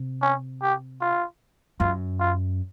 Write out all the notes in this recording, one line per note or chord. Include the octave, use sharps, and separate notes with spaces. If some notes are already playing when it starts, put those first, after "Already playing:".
Already playing: C3
C#4
G4
F4
F#2 F4
F4